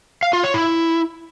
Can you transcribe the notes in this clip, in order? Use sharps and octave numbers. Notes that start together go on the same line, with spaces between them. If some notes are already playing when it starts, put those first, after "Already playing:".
F5
F4
C#5
E4